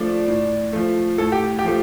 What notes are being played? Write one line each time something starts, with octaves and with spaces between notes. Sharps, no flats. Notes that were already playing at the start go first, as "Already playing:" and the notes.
Already playing: F3 A3 D4 D5
A2
F3 A3
A2 A4
G4
G4
F3 A3